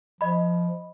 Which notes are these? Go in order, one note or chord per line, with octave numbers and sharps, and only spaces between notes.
F3 D#5 B5